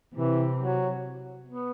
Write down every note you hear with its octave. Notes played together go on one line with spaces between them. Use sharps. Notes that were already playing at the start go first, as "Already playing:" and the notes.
C3 E3
F#3
B3